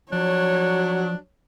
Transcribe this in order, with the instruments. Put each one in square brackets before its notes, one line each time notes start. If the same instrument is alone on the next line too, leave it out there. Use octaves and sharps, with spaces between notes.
[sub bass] F3 [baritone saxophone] F#3 [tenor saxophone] D4 [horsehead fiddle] C#5